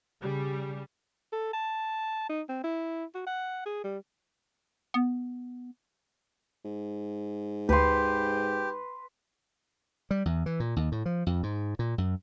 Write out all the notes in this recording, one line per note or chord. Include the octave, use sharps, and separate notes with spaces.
C#3 G3
A4
A5
D#4
C4
E4
F#4
F#5
G#4
G3
B3
G#2
D2 G4 B4 C6
G3
E2
E3
A#2
D#2
A2
F3
F2
G#2
A#2
F#2